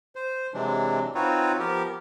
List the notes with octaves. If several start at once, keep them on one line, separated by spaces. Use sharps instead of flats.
C5
C3 E3 F#3 G#3 D4
C4 D#4 F4 F#4 B4 C#5
F3 B3 G4 A#4